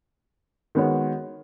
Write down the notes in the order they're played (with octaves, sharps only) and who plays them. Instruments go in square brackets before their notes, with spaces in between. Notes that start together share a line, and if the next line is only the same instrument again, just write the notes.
[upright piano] D#3 G#3 B3 F#4 C#5